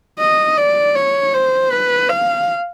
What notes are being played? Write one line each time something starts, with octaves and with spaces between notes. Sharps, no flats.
D#5
D5
C#5
C5
B4
F5